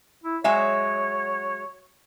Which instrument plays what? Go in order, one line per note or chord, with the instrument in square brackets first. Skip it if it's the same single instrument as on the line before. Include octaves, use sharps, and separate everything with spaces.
[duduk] E4
[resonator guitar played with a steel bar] F#3 G#3 E5 [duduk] C#5